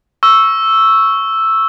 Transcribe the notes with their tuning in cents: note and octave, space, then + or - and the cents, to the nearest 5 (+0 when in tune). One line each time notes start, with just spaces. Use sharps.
C#6 +0 E6 +0